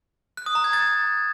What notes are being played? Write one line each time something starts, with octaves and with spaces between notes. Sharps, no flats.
F#6
D#6
A#5
G#6
A6